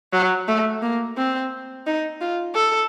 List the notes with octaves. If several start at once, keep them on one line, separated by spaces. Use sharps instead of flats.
F#3
A3
A#3
C4
D#4
F4
A4